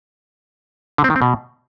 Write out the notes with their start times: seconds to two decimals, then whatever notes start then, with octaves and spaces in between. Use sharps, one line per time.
0.98 D3
1.04 C4
1.10 D#3
1.16 C4
1.22 B2